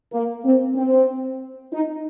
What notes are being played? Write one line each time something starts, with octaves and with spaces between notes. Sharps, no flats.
A#3
C4
C4
D#4